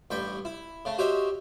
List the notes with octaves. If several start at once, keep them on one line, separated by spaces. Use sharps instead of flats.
A1 G2 G5 B5 C#6
E4
C#3 A3
F#4 G4 C5 C#5 D#5 E5